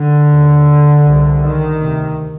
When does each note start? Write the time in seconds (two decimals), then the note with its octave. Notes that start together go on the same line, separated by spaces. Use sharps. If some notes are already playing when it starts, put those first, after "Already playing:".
Already playing: D3
0.31 D#2
1.04 C2 C3
1.41 D#3
1.79 D2 C3